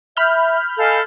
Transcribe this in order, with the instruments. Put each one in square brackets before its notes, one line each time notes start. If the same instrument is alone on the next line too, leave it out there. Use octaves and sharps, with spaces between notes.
[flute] E5 [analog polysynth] B5 F6 G6
[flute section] A4 D#5 F5 [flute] G#5